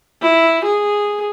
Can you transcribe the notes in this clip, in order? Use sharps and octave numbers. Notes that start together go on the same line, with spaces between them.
E4
G#4